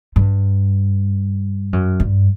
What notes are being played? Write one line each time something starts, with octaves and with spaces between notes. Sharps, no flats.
G2
F#2
G2